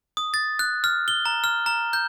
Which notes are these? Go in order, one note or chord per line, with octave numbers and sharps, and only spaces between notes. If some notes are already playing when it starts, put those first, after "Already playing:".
D#6
A6
F#6
F6
G7
A#5
F6
A#5
G6